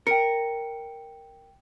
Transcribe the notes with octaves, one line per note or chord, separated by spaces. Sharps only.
A#4 G5 C#7